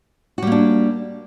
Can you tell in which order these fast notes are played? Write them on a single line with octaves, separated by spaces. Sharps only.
F#4 G3 A#3 D4